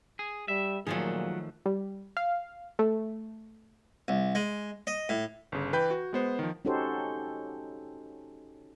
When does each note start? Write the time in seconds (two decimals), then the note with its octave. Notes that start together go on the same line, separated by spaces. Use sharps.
0.19 G#4
0.48 G3 E5
0.87 A#2 D#3 F3 F#3 A3 F4 G#4
1.66 G3
2.17 F5
2.79 A3
4.08 C2
4.35 G#3
4.87 D#5
5.09 A2
5.52 G1 C#3
5.73 E3 B4 G5 B5 G6
5.91 F#4
6.13 G#3 B3 C5
6.39 D#3 F3
6.65 C#4 D#4 F#4 G4 A4 C5